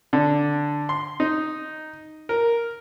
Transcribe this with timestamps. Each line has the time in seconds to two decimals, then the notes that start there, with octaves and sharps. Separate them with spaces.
0.13 D3
0.89 C6
1.20 D#4
2.29 A#4